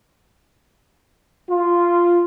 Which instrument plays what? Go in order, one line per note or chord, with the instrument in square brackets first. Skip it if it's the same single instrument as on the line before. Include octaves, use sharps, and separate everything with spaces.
[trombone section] F4